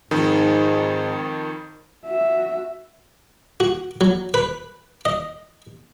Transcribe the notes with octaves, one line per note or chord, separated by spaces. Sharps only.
F2 G#2 D#3
F#4 E5
F#4
F#3
B4
D#5